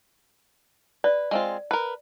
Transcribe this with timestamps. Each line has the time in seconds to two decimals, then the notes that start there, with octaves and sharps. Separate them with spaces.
1.04 B4 D5
1.31 G#3 C4 F4
1.71 A#4 B4